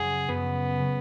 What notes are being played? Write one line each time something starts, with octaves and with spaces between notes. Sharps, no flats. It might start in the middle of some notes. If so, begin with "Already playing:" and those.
Already playing: F#2 C#3 F#3 C#4 G#4
F#2 C#3 F#3 B3 C#4
C#3 F#3 C#4